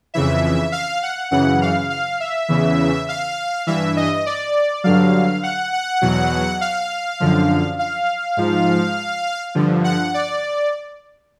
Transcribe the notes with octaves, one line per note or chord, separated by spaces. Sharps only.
F2 C#3 E3 E5
F5
F#5
F#2 C#3 E3 F#5
F5
F5
E5
E2 C#3 E3
F5
G2 E3 E5
D#5
D5
G2 D3 F#3 F5
F#5
F#5
E2 B2 F#3
F5
F#2 D3 F3
F5
G#2 F3
G2 D3 F3
F#5
D5